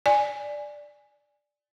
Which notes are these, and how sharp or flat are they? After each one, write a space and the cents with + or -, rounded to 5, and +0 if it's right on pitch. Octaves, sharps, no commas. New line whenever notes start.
D5 +0 G#5 +0